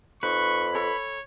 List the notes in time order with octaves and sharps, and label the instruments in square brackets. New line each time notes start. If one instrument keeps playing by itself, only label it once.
[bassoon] F2 [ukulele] D#4 [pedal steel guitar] B4 [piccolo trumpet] C#6
[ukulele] A4 B5 [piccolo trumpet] C#5